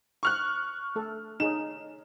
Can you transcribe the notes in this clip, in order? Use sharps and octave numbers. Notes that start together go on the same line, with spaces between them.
C#6 F6 F#6
A3 A4
D#4 G#4 C#5 E7